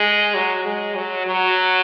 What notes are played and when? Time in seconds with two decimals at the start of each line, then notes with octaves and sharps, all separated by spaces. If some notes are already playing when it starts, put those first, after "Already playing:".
Already playing: G#3
0.35 F#3
0.65 G#3
0.95 F#3
1.26 F#3